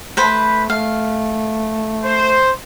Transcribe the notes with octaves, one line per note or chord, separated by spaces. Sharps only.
A3 B4 C5 B5
A3 F5
C5